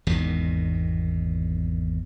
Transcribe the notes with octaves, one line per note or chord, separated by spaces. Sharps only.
G#1 E2 B2 D#3